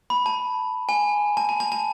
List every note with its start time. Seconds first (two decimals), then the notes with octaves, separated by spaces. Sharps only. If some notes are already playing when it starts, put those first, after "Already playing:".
0.10 B5
0.26 A5
0.89 G#5
1.37 A5
1.49 A5
1.60 A5
1.72 A5